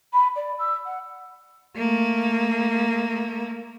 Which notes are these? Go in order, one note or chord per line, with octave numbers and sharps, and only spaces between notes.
B5
D5
E6
F#5
A3 A#3